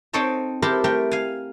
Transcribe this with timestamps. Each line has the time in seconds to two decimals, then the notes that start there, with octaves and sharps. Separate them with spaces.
0.13 C4 D#4 A4 C#5 G5 A5
0.62 E4 G4 A4 A#4 C5
0.84 A3 A#4 G5
1.11 F5 G#5